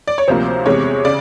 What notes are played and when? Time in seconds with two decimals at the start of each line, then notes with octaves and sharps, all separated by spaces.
0.07 D5
0.18 C#5
0.28 D2 C3 F3 A#3 C5
0.66 E2 C3 E3 G#3 C#5
1.05 C#3 D5